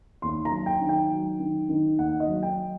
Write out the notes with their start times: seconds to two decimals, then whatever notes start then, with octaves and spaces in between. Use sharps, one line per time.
0.22 D#2 C6
0.45 A#5
0.51 F#3
0.66 G5
0.81 D#3
0.89 G5
1.11 F#3
1.40 D#3
1.69 D#3
1.98 D#2 F#5
2.20 D#5
2.28 F#3
2.43 G5